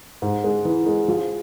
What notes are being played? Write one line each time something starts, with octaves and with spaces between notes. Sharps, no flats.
G#2
G#3
E3
G#3
F3